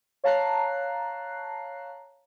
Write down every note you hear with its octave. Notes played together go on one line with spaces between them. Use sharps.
C#5 F5 A5 A#5 F#6 C7